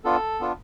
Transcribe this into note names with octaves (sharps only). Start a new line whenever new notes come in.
B3 D4 F4 A4
B3 D4 F4